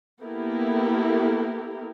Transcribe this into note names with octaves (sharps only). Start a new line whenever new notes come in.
A#3 B3 E4 G4 A4 A#4